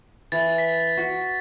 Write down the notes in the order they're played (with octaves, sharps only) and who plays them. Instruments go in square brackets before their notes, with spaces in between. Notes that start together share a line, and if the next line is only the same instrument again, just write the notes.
[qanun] E3 [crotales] A6
[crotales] B6
[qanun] F#4